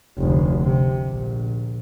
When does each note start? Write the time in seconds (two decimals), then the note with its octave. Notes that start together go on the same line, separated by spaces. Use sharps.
0.19 F1 D2
0.62 C3
1.10 A#1